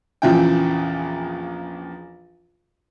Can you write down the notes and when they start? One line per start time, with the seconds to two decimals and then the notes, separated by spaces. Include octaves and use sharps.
0.22 A#1 E2 A#2 C#3 E4 G5